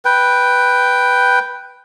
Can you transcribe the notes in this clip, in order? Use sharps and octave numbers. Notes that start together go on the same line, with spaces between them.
B4 G5